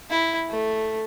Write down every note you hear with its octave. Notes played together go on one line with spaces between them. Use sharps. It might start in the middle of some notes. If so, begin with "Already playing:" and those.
E4
A3